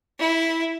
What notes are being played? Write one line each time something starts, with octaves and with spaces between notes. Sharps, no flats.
E4